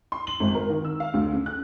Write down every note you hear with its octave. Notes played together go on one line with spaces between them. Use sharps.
C6
F#7
G#1
A#4
D#3
E6
F5
D2
C#3
F#6